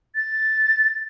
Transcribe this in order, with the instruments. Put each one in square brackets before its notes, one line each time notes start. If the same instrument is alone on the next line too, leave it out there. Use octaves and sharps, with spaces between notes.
[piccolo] A6